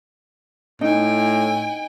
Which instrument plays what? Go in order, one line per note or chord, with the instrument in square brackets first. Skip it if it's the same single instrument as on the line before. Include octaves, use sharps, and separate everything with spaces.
[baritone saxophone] A2 [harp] D#4 [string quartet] G5 G#5